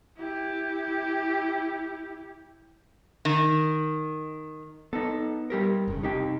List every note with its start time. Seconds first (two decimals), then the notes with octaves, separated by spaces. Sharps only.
0.18 E4 G4
3.25 D#3
4.93 B3 D#4 A4
5.50 G3 G4 A#4
5.88 F1 G2 C#3
6.03 C3 D#4 G4 G5